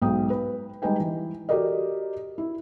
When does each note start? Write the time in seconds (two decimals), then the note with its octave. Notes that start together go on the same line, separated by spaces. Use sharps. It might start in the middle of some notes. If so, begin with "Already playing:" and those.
0.02 B1 G#2 G5 D#6
0.30 B4
0.82 G3 G#3 D#4 B4 G5 G#5
1.00 E3
1.49 F#4 G4 A4 A#4 D5 D#5
2.38 E4